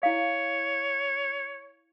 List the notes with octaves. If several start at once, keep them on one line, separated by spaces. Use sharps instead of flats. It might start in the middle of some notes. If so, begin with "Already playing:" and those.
E4 C#5 F5